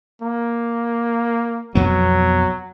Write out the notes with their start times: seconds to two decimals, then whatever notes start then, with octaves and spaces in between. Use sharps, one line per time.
0.22 A#3
1.75 B1 F2 F#3 B3